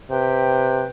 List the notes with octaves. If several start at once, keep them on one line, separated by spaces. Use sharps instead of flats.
C3 B4 G5